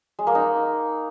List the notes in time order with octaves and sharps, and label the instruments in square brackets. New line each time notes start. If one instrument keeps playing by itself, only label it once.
[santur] G#3
A#3
D#4